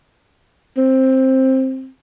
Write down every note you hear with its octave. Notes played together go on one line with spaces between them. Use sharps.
C4